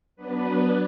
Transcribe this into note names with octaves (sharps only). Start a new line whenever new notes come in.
F#3 B3 D4 B4